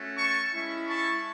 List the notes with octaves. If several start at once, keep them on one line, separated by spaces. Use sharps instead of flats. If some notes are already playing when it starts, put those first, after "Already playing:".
Already playing: A3 C#4 F#4
A5 C#6
G#3 C#4 E4
A5 C#6